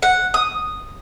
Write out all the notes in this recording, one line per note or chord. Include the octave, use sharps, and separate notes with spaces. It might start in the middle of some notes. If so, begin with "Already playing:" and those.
F#5
D#6